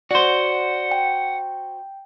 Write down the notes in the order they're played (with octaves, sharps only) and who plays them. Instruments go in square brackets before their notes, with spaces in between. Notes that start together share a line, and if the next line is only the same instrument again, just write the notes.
[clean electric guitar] F#4 C5 [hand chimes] D5 [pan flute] F#5
[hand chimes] G5